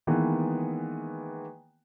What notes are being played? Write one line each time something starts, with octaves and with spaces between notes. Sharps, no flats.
D#3 E3 G#3 A#3 B3